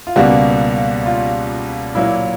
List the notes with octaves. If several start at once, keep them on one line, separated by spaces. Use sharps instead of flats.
F4
C#2 B2 G3 A#3 F#4
F4
A#2 F#3 A#3 E4